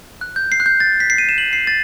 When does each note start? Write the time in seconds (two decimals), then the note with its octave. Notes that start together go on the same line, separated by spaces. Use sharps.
0.21 F#6
0.36 G6
0.52 C7
0.60 F#6
0.66 G6
0.80 A6
1.00 B6
1.10 C7
1.18 D#7
1.29 E7
1.38 F#7
1.53 C7
1.67 A6